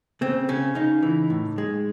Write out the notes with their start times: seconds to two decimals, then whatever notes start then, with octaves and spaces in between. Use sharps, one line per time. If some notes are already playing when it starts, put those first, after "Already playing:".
0.21 C#3 C4
0.49 C#3 C#4
0.75 C#3 D#4
1.03 E3
1.30 A2
1.58 G#3